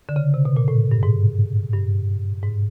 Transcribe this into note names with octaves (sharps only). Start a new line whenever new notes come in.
D3
C#3
C3
B2
A#2
A2
G2
G#2
G2
G#2